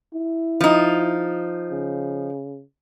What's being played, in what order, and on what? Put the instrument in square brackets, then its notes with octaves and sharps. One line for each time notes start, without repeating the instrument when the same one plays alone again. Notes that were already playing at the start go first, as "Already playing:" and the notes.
[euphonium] E4
[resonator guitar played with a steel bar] F3 D#4
[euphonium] C#3